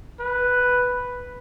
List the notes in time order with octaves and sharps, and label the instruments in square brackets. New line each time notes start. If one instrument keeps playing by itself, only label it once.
[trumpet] B4